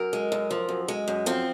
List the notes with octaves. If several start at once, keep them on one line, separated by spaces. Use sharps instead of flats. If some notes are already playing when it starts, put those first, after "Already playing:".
Already playing: F#2 A#4
G#3
F#2
F3
F#2
G#3
F#2
F3 C4